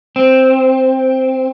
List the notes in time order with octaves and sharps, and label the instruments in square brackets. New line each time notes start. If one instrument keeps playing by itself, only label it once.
[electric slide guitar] C4